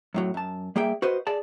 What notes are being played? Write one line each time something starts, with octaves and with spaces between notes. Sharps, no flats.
F#2 A2 F#3
F#2 A5
G3 A#3 G#4 E5 G5
F#4 B4 C5 D#5
G#4 D5 A5